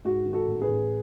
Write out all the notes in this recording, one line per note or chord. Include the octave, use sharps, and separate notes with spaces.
G#2 F#4
D#3
F#4 A4
A1
G#4 B4
A1